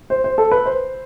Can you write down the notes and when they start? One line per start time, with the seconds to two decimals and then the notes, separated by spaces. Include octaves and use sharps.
0.10 C5
0.24 C5
0.38 A4
0.51 B4
0.66 C5